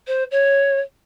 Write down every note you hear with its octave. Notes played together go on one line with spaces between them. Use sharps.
C5
C#5